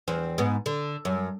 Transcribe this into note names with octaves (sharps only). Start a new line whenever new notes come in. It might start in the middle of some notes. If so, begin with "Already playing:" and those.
E2 C4
G#2 B3
D3
F#2